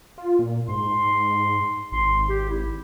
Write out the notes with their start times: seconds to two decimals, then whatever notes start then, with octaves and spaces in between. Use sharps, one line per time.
0.18 F4
0.39 A#2
0.68 G#2 C6
1.92 G#1 C6
2.29 G4
2.50 E4